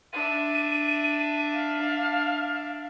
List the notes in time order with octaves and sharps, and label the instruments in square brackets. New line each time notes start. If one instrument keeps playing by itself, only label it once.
[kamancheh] D4 E5 [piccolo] D#7
[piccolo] F5